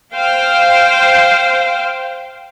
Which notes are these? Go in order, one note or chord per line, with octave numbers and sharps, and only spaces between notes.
C5 F5 G5